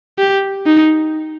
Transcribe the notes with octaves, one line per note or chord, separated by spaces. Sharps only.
G4
D#4